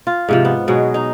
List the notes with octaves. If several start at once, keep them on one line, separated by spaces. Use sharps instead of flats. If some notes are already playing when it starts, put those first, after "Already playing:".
F4
G#2 C3 F3
B3
B2 F#3 G#3
D#4